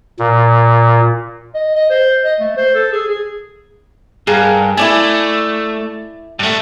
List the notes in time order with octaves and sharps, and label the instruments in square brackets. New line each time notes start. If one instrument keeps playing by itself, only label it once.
[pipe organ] A#2
[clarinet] D#5
D#5
C5
D#5
A3
C5
A4
G#4
G#4
[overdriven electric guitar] G2 [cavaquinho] G#4 A#4 F5
[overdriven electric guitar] A3 [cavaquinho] E4 D5 G#5
[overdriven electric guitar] G2 A3